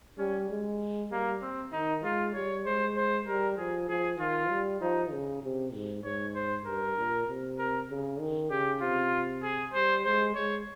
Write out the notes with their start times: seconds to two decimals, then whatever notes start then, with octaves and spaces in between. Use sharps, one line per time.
0.18 G3 C#4
0.50 G#3
1.11 G3 A#3
1.42 C4
1.72 D#3 D#4
2.03 G#3 F4
2.34 G3 C#5
2.65 G#3 C5
2.97 C5
3.26 G3 A#4
3.57 F3 G#4
3.89 F3 G#4
4.19 D#3 F4
4.50 G3
4.81 F3 D#4
5.12 C#3
5.43 C3
5.74 G#2
6.04 G#2 C#5
6.35 C5
6.65 G2 A#4
6.97 A#2
7.27 C3
7.59 A#4
7.90 C#3
8.20 D#3
8.50 C#3 G4
8.81 C3 F4
9.43 G#4
9.74 G3 C5
10.05 G#3 C5
10.35 G#3 C#5